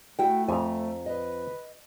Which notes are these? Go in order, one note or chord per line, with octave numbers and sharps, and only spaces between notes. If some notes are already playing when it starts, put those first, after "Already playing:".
A3 E4 F#4 G5
F2 G#5 A#5
B4 D#5